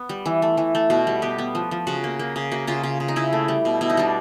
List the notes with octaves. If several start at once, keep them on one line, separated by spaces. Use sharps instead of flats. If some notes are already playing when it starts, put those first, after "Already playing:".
Already playing: B3
G3
E3
A3
E3
A3
B2 F#4
G3
B3 G4
B3
F3
F3
C#3 F#4
A#3
A#3
C#3
A#3 F#4
C#3 F4
C#3
C#3
D#4
C#3 E4
A3
G3
B2
B2 E4
D#4
G3 D4